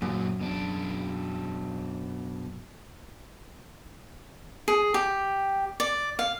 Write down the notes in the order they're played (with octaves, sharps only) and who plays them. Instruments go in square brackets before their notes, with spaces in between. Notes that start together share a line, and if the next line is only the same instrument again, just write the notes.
[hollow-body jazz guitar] F#2 [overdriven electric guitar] A#2 F#3
[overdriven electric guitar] B2 D4
[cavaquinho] G#4
G4
D5
F5